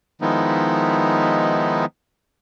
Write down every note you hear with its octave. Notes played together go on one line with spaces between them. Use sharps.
D#3 F3 G#3 B3 D#4 E4